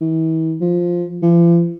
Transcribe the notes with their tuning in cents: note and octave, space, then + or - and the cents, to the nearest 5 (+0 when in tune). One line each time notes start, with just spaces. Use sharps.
E3 -40
F3 +5
F3 -45